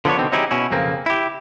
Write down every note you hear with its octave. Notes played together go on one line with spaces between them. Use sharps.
D3 F3 A#3 B3 D4 C#5
B2 D3 D#3 C4
F#3 C4 D#4 E4 G4 G#4
B2 C#4 E4
B1 F2 C#3 A#3 C4
E4 G4